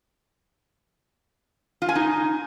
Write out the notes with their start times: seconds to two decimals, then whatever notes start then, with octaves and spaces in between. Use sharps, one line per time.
1.82 F4
1.89 G#5
1.96 D#4